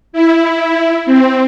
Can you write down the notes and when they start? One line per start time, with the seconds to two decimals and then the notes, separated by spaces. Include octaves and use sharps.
0.13 E4
1.06 C4